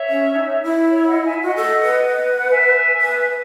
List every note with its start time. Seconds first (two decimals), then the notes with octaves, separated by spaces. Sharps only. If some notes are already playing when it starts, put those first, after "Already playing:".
Already playing: C#5 E5
0.10 C#4
0.36 D#4
0.63 E4
0.89 C#5 E5
1.06 D#5 F#5
1.25 E5 G#5
1.42 F#4 D#5 F#5
1.56 A4
1.82 B4
2.38 F#5
2.49 E5 G#5
3.02 B4
3.29 B4